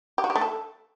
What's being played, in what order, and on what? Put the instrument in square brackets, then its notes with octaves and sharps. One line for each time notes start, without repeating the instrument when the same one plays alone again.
[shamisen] G4
F#4
G4
A3
A4